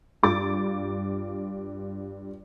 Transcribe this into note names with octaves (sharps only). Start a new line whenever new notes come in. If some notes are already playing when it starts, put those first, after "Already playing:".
G2 F4 D6 A6